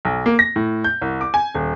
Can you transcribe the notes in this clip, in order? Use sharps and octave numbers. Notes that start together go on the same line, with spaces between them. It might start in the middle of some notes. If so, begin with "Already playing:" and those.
B1
A#3
A#6
A2
G6
C2
D6
G#5
D#1